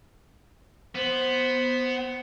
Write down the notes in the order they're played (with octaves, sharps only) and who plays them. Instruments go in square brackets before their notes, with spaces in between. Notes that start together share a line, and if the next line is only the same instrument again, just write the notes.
[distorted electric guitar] B3 [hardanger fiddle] C5